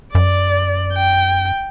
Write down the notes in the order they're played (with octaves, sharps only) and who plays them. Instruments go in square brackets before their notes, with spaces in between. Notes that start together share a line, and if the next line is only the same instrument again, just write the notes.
[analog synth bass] F#2 [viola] D5
[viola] G5